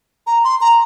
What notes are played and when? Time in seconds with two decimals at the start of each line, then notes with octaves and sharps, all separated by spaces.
0.27 A#5
0.44 C6
0.61 A#5